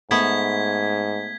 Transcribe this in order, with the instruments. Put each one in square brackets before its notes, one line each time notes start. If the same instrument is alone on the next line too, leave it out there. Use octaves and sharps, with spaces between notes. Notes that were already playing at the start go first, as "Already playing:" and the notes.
[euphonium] G#2 [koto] A3 B3 [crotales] G#6 B6 G7